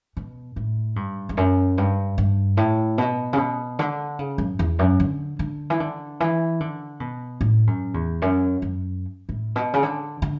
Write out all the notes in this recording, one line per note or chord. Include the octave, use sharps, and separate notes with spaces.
B2
A2
G2
E2
F#2
G2
G2
A2
B2
C#3
B2
D3
C#3
F#2
E2
F#2
D3
D3
E3
D3
E3
D3
B2
A2
F#2
E2
F#2
F#2
A2
B2
C#3
D3
D3